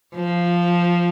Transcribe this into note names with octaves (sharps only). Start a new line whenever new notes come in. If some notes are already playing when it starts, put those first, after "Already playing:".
F3